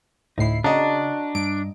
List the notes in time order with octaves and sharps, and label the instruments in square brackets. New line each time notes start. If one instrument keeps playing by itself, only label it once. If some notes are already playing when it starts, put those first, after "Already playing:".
[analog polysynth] D2 A2 C7 [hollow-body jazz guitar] D#4 E4
[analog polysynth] C#3 [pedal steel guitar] D4 [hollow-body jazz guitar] F#4 [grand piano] D#5 A5 A#5
[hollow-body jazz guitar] G2 [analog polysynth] D7